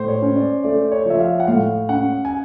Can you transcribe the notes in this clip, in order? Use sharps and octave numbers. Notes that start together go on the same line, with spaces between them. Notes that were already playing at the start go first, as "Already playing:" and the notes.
Already playing: A2 C5
C#5
C#4
D5
A3 D5
C#5
F3 E5
F5
F#5
A2 F5
C#4 F#5
G#5